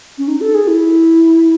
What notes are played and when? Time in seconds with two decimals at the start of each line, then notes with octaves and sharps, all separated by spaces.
0.18 C#4
0.28 D#4
0.41 A4
0.54 G#4
0.68 E4